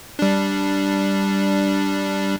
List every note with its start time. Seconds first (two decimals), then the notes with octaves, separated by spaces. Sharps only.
0.19 G3 D4